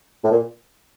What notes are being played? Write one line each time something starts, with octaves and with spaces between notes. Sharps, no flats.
A2
A#2